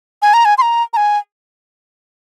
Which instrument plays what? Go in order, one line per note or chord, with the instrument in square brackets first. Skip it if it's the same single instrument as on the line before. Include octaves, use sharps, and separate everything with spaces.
[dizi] G#5
A#5
G#5
C6
A#5
A#5
G#5